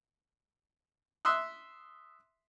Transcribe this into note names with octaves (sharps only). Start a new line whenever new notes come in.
E5 C6 D#6 E6 F#6